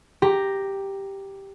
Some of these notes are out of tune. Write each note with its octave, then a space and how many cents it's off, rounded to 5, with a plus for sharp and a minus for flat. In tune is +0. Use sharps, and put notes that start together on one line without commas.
G4 +0 A#5 +0